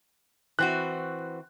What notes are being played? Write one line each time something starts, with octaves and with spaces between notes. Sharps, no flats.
E3 C4 F#4 F#6